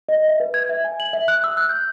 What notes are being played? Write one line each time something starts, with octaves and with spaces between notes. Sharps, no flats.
D#5
E5
B4
G#6
E5
G#5
F#7
E5
F#6
E6
F#6
G6